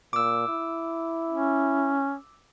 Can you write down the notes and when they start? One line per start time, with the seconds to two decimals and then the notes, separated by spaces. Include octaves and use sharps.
0.13 A#2 D6 E6
0.49 E4
1.31 C#4